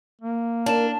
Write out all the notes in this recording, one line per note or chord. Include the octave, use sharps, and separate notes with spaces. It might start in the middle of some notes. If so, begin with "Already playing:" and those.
A#3
D4 A#4 A5 E7